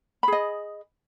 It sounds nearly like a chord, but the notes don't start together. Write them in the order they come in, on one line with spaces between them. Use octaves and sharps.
B5 G#4 D#5